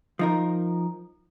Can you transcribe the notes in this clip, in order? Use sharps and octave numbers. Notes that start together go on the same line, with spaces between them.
F3 D#4 A#4